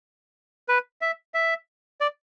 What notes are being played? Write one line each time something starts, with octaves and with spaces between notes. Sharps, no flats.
B4
E5
E5
D5